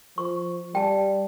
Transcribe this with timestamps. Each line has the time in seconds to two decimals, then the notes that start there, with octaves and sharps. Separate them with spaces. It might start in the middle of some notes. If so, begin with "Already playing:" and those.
0.18 F3 C#6
0.75 G3 G5 A5